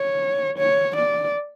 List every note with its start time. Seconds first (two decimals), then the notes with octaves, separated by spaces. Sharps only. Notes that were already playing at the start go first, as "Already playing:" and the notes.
Already playing: C#5
0.58 C#5
0.95 D5